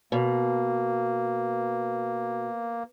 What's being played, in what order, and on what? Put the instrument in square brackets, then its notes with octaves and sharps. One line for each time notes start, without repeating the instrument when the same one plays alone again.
[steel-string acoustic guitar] B2 [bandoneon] A#3